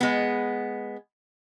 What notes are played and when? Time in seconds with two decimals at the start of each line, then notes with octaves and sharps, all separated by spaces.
0.01 G#3 B3